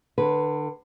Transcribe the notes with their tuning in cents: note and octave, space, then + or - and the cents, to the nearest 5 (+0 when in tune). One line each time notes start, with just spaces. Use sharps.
D3 +30 B4 -5